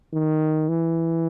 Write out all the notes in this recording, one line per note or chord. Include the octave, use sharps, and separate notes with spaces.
D#3
E3